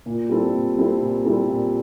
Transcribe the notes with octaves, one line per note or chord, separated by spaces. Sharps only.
A#2
G3 C4 E4 A4
A#2
G3 C4 E4 A4
A#2
G3 C4 E4 A4
A#2